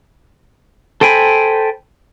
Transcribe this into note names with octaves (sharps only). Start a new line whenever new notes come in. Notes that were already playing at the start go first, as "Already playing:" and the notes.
A4 C5 G5 G#5 B5